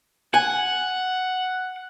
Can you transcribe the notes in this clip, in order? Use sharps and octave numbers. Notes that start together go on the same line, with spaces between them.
F#5 G#5